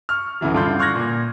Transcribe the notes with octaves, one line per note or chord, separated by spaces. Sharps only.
C#6 F6
D2 C#3 E3 F#3
G2 D3 F4 C6 G6
C6 C#6 F6 F#6 G#6 A#6
A#2